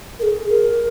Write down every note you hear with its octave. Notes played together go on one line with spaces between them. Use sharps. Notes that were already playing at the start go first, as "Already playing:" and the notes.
A#4
G#4
A#4